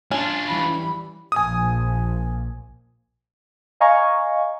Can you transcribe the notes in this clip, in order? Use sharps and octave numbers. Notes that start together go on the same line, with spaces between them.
C#4 D4 F4
E3 G3 B5
A#1 A#2 F3 G#5 D#6
D#5 F5 G#5 A#5 C#6